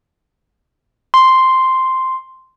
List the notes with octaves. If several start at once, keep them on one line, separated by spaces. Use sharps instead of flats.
C6